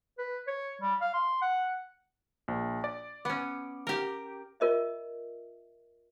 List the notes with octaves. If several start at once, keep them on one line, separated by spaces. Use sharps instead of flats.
B4
C#5
G3
F5
C6
F#5
A#1
D5
B3 C#4 D6
G4 A#4
F4 A#4 D#5 E5